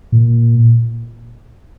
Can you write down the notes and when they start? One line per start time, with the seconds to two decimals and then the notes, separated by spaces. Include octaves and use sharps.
0.12 A#2